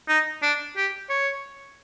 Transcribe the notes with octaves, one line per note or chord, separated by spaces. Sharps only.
D#4
D4
G4
C#5